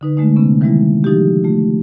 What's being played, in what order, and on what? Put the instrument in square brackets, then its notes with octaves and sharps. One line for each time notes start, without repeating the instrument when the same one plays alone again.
[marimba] D3 D#4 B4
D3 G#3 A3 D#4
C3 B3 C#4
D#3 E3 G3 G#3 A#3 E4
F3 D#4 F#4 G4
A3 F4